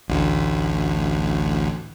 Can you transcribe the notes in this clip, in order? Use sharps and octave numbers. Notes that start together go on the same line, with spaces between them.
A1 D2